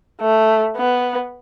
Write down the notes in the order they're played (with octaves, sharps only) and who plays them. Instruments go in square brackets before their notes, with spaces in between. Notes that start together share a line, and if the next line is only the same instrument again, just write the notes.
[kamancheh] A3
B3